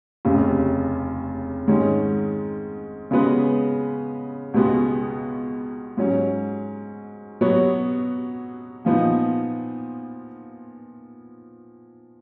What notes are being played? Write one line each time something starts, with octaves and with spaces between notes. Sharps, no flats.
F1 D#2 C#3
G#2 D#3 G#3 C#4
C#3 G#3 B3 F#4 B4
C#2 B2 G#3 B3 F#4
G#2 F#3 C#4
B2 F#3 B3 F#4 C#5
A#2 F3 B3 D#4